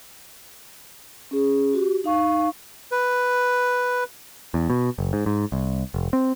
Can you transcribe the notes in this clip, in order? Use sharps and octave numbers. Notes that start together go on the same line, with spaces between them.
C#4 G#4
F#4 G4
D#4 F5 C#6
B4
E2
B2
F#1
G#2
G#2
C2
F1
C4